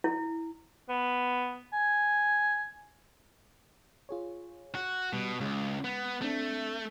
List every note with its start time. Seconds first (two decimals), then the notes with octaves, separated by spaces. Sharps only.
0.04 E4
0.89 B3
1.73 G#5
4.09 F4 G#4 C#5
4.75 F#4
5.13 B2 G3
5.41 C#2 G#3
5.84 B3
6.21 A3 C4 D4